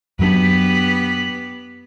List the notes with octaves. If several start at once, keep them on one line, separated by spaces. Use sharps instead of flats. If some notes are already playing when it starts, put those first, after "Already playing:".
F#2 F#3 B3 D4 G4 B4